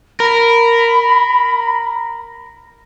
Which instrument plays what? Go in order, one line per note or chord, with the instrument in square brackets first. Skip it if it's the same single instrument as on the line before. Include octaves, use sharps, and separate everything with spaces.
[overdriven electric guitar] A#4 [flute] B5